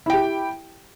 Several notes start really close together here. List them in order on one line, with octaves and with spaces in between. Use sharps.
E4 G5 G4